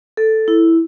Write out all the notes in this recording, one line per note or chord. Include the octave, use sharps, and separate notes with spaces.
A4
E4